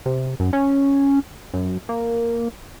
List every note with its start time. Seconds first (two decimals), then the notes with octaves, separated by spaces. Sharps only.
0.06 C3
0.40 F#2
0.53 C#4
1.54 F#2
1.89 A#3